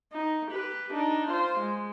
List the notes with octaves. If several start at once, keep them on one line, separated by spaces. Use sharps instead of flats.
D#4
G4 B4
D4 D#4
F4 C5
G#3